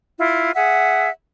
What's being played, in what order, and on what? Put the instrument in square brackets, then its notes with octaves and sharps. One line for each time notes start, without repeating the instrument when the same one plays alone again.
[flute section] E4 F4
G#4 E5 F#5